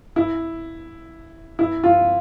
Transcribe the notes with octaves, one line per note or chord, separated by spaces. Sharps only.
E4
E4
F4